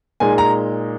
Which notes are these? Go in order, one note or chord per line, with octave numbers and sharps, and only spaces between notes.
A#2 G#3 D#4 G#5
A#5